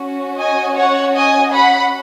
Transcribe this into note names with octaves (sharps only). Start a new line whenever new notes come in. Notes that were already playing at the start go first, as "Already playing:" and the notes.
Already playing: C#4 F#4
D#5 G#5
C#5 F#5
D#5 G#5
F#5 B5